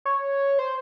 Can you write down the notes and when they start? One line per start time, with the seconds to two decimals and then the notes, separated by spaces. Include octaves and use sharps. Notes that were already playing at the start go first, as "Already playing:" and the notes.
0.05 C#5
0.59 C5